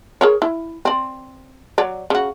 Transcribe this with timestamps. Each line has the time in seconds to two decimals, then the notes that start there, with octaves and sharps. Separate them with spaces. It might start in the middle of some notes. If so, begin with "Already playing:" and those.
0.21 G#4 A#4 C#5
0.42 E4
0.85 C4 D5
1.78 F#3 C#5 D5
2.10 C#3 F#4